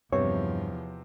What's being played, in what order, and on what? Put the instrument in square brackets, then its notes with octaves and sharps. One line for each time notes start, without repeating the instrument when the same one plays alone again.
[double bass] E2 F3 [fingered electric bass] G2 [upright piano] C3 B3 C4 [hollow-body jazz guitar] C#5